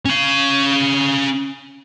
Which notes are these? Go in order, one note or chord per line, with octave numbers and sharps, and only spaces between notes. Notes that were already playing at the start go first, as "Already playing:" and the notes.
C#4 F5